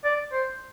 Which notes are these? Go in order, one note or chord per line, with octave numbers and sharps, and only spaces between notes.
D5
C5